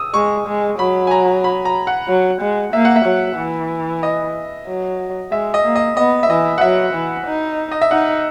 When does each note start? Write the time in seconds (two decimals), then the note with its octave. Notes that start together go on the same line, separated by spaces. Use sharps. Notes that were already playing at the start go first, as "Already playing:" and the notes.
Already playing: D#6 E6
0.14 G#3 C#6
0.47 G#3
0.79 F#3 B5
1.07 G#5
1.11 A#5
1.44 B5
1.65 A#5
1.87 F#5
2.08 F#3
2.41 G#3
2.73 A#3 E5
2.85 F#5
2.96 E5
3.05 F#3
3.37 E3
4.03 D#5
4.68 F#3
5.32 G#3 E5
5.54 D#5
5.65 A#3
5.76 D#5
5.97 B3 D#5
6.23 E5
6.30 E3 D#5
6.58 F#5
6.61 F#3 E5
6.94 E3
7.27 D#4
7.71 D#5
7.81 E5
7.91 D#4 F#5